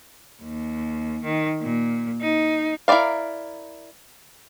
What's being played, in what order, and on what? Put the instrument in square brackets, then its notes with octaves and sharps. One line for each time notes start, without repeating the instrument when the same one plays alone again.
[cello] D#2
D#3
A#2
D#4
[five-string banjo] E4 A#4 C5 D5 F5